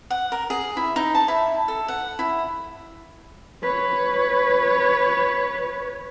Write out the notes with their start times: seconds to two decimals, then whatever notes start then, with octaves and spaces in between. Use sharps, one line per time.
0.10 F#5
0.32 A#4
0.50 G#4
0.77 E4
0.96 D#4
1.15 A5
1.28 E4
1.68 A4
1.88 F#5
2.19 E4
3.63 B4 C#5